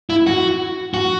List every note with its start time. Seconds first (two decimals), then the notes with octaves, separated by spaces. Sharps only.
0.10 E4
0.27 F#4
0.94 F#4